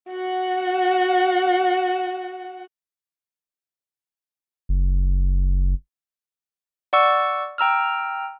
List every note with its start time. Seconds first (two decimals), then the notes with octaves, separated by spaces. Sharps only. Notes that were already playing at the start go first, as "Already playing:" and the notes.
0.10 F#4 F#5
4.69 F#1
6.93 D5 F#5 C#6 E6
7.58 G5 A#5 E6 F6